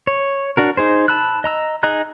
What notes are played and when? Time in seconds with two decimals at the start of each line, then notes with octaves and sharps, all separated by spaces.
0.07 C#5
0.57 D4 F#4 A#4
0.77 D#4 G#4 C5
1.08 A5 B5 E6 F#6
1.44 D#5 A#5 E6
1.83 D#4 G#4 D#5 A#5 F#6